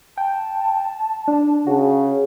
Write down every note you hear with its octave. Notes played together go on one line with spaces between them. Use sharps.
G5 A5
D4
C#3 F#4